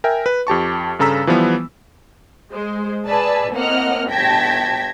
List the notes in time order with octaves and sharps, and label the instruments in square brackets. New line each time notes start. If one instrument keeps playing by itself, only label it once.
[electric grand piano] A#4 E5 G5 G#5
B4
F2 G4 A5 C#6
G2 C#3 A4 A#5 E6 B6
E3 F3 G3 B3
[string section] G#3 C5
G#4 B4 D5 G#5 A5 E6
A2 A#3 C4 D#5 F#5 F6
G1 G5 A5 G#6 A#6 B6